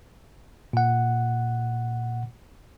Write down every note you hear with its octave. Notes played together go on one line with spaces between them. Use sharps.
A#2 F#5